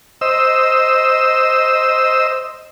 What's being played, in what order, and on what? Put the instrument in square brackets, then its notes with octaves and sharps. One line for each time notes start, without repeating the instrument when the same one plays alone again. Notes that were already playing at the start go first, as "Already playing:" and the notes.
[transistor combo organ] C5 D#5 E6